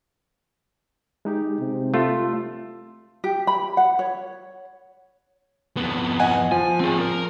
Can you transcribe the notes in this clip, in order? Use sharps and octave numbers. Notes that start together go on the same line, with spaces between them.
G#3 D#4 G4
C3
A3 F4
G4
B5
F#5
C#5
F2 B3
D#5 F#5 G#5
F3 G#5
C4 G#4
A#4